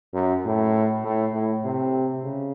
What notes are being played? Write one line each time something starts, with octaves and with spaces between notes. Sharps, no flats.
F#2
A2
A2
A2
C3
C#3